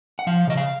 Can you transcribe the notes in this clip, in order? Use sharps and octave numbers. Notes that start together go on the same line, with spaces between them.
F#5
F3 F5
C#3 D#5
F5